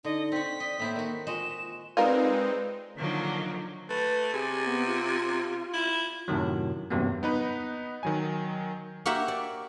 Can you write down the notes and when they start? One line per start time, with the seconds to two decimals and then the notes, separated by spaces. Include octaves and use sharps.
0.05 D3 D#4 D#5
0.32 C4 F#4 B6
0.60 D5 D#5
0.80 A2 A#3 E4 C5
0.96 D#3 F#4
1.27 G#3 F4 F#4 D#5 E7
1.97 G#3 C4 D#4 F4 A#4 B4 D5
2.97 D3 D#3 F3 F#3 A#3
3.90 A3 B4
4.33 C3 G#4
4.66 B3
4.87 F4
5.73 E4
6.28 F#2 A2 C3 D#3 F#3
6.90 E2 G2 C3 F#3 A#3 B3
7.23 B3 D#4 B4
8.03 D#3 F#3 G#5
9.06 A#3 F#4 G4 E5 F#5 A#5
9.28 D5